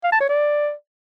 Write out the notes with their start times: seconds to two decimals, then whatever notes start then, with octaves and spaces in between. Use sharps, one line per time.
0.04 F5
0.12 A5
0.21 C#5
0.29 D5